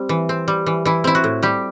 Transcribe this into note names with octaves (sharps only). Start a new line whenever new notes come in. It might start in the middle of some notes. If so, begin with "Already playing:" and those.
Already playing: G3 C4
E3
C4
G3
E3
E3 E4
C4 E4
F#4
A2
G3 G4